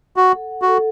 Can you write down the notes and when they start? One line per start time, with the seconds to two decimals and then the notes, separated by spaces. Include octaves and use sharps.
0.16 F#4 F#5
0.34 A4
0.51 F#5
0.62 F#4
0.68 A4